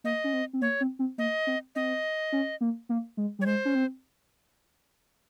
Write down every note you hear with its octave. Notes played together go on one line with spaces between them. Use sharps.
A#3 D#5
C#4
C4
C4
A#3 C#5
C4
C4
A#3 D#5
C4
C4 D#5
C#4
A#3
A#3
G#3
G3
C#5
G#3 C5
C#4
C4